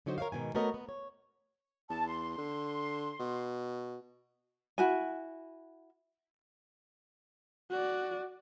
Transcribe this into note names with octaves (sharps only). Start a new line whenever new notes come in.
D3 F#3 D#4 F#4 C5
A#4 C#5 D5 E5 F5
G#2 B2 D#3 G#5
A3 B3 F#4 A#4 C#5 D#5
B3
C#5
E2 A5
C6
D3
B2
E4 F#4 G#5
F#4 D5